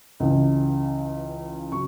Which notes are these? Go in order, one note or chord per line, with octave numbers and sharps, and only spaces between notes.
C#2 C#3 E3
C#3 F#3 C#6